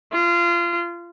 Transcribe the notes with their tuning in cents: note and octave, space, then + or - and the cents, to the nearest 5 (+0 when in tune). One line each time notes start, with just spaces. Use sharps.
F4 -25